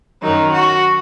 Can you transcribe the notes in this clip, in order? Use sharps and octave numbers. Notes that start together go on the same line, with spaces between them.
F#2 D#3 F#3 D#4
F#4